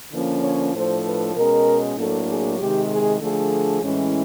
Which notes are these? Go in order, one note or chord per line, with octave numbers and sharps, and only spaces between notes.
D3 F3 A#3 C#4
C#5
A2 F3 A3 D4 C5
B4
B2 G#3 C#4 A#4
A2 F#3 A#3 D4 A4
G#4
C3 D#3 G#3 G4
G#4
D3 F3 A3 D4 G#4
A2 E3 G#3 C#4